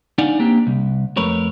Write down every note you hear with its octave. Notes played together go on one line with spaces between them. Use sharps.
D4 D#4 D5 F5 F#5 G#5
A#3 C4 D4 G4
C2
F2 A3 A#4 B4 C#5